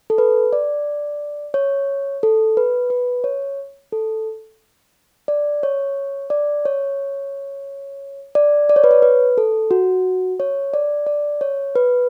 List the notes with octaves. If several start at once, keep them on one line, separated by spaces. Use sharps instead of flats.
A4
B4
D5
C#5
A4
B4
B4
C#5
A4
D5
C#5
D5
C#5
D5
D5
C#5
B4
C#5
B4
A4
F#4
C#5
D5
D5
C#5
B4